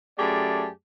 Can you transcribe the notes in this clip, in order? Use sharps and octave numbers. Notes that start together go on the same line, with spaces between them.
F#2 A3 G4 G#4 D5 A5